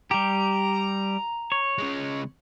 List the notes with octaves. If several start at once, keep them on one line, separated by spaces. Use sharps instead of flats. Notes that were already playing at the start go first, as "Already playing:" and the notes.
G3 G4 A#5
C#5
C#3 G#3